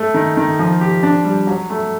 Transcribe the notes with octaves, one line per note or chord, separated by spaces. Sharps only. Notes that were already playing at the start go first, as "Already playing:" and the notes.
Already playing: A3
D#3
D#3
F3
G4
D4
G3
F#3
A3